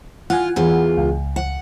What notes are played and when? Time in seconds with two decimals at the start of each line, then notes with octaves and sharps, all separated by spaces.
0.30 F4 F#5 G#5
0.56 E2 F4
0.97 C#2
1.36 F#5